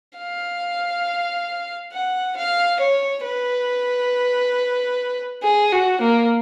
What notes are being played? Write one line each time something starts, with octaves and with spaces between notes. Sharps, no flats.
F5
F#5
F5
C#5
B4
G#4
F#4
A#3